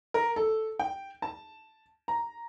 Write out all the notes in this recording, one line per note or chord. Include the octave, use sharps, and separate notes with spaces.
A#4
A4
G5
A5
A#5